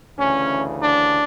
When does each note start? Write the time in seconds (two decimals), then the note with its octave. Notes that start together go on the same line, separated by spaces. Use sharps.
0.18 D2 C#3 E3 C#4
0.82 D4